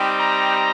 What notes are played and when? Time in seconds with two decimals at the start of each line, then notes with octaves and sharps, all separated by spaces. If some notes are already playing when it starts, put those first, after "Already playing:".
Already playing: G3 C4 D#4 G4
0.19 A#5